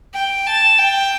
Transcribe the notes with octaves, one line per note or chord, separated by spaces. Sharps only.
G5
A5
G5